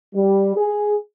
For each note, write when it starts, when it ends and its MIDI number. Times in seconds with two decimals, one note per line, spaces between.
0.14 0.52 55
0.56 0.95 68